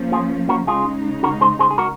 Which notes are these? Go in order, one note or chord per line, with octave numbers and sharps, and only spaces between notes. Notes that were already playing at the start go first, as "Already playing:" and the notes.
Already playing: F3 A#3 C#4
F4 G#4
F#4 A#4
C#3 G#3 D#4 F4 G#4
F#4 A#4
G#4 C5
G#4 C5
G#4
F#4 A#4